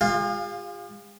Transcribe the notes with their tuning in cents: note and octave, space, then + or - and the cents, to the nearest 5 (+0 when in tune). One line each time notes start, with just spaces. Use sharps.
F4 +20 G#4 -45 F5 +0